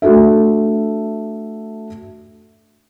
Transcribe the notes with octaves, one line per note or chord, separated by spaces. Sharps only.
A3 D4 F#4 A4 E5